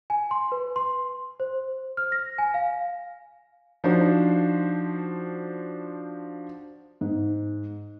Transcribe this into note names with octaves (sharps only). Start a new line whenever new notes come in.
G#5
C6
B4
C6
C5
F6
A#6
G#5
F5
F3 D4 D#4 F#4 C5
G#2